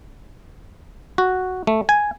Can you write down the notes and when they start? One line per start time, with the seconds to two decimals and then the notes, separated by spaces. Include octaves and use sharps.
1.18 F#4
1.67 A3
1.89 G#5